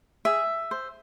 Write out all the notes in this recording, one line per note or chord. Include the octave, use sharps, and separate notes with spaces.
G#4 E5
C5